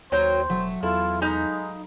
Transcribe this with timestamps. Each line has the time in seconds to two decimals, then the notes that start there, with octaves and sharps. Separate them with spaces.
0.12 D#2 F#3 A#4 C5 G5 C6
0.50 E1 F#3 A3
0.83 E2 E4 F4 A4
1.22 G#3 D#4 F5 A#5 B5